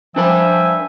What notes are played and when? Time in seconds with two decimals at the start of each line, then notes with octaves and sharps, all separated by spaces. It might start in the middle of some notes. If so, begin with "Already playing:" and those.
0.16 F3 D4 B4 E5 G#5 B5